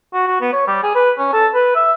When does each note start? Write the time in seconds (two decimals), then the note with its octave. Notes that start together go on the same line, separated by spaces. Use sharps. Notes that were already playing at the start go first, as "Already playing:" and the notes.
0.14 F#4
0.27 F#4
0.41 B3
0.53 C#5
0.67 G3
0.83 G#4
0.95 B4
1.18 C#4
1.33 A4
1.54 B4
1.75 E5